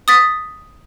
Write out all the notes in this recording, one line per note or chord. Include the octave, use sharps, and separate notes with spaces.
D#6 A6 B6